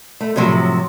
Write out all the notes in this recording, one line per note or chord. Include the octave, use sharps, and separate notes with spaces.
A3
A2 C3 F3 F#3